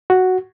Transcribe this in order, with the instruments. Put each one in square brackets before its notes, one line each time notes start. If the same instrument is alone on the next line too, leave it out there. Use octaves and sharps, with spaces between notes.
[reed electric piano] F#4